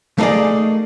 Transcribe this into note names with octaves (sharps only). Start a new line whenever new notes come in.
A3 A#3 D#4 G#4 D5